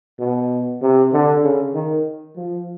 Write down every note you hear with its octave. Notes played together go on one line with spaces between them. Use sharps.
B2
C3
D3
C#3
D#3
F3